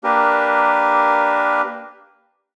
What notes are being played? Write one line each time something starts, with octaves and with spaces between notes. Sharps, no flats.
A#3 D4 G4 A#4 B4